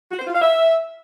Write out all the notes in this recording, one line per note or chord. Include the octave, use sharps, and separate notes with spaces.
F#4
C5
F4
F5
E5